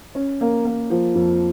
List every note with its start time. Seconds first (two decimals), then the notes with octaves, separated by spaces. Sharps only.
0.15 C#4
0.41 A#3
0.65 A#3
0.90 F3
1.15 F2